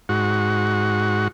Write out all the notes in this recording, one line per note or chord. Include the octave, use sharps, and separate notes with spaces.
G#2 F#4